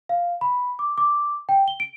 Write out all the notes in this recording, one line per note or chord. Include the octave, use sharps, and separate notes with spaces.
F5
B5
D6
D6
G5
G7
D7